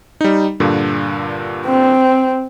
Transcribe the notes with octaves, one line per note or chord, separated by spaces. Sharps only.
G3 D#4
G2 A#2 D3
C4